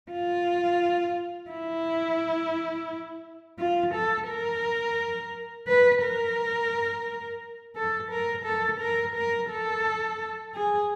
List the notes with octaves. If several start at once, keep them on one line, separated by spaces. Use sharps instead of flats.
F4
E4
F4
A4
A#4
B4
A#4
A4
A#4
A4
A#4
A#4
A4
G#4